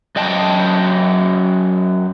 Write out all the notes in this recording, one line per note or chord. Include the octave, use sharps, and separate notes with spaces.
F#2 D#5 G5 A5